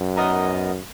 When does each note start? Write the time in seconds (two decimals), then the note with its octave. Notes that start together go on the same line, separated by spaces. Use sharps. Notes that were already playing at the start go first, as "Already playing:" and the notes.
Already playing: F#2
0.17 B3 D#4 A#4 D#5